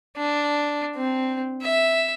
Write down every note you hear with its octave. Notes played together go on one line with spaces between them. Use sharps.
D4
C4
E5